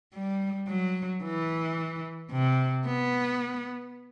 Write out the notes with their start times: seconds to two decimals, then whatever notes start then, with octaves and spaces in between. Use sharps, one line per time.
0.15 G3
0.69 F#3
1.24 E3
2.32 C3
2.86 B3